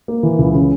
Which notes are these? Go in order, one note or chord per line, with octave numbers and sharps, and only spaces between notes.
A#3
E3
C#2
C#3